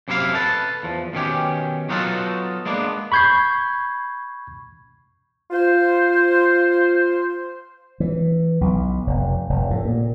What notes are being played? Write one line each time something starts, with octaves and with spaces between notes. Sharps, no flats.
F#2 C3 A#3 E4 F#4 F5
A4 B4 A5
E2 F3
B2 D#3 C#4 G4
F#3 B3 D#4 F4 F#4 A4
G#3 A#3 B3 D4
B5 C#6 G6 G#6 C7
F4 C5
E3
B1
F1
F1
A2
A#2